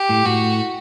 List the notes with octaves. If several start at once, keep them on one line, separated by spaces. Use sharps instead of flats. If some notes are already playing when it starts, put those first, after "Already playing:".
Already playing: G4
A2
A2 F#4